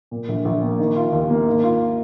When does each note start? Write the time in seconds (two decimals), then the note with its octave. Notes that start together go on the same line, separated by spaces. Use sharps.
0.11 A#2
0.28 A#1
0.45 A#1
0.62 A#3
0.79 D#3
0.96 F4
1.12 D#2
1.30 A#3
1.46 G#2
1.64 F4